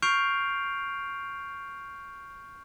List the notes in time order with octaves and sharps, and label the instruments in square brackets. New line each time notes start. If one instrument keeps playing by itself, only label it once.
[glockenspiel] C#6 F6 G6 C7 D7 F7